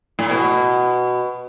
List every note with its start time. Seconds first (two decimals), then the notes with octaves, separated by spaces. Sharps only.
0.19 A2
0.30 B2